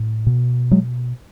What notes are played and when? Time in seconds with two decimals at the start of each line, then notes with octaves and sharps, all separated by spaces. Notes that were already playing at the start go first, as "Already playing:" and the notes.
Already playing: A2
0.26 B2
0.71 F#3 G#3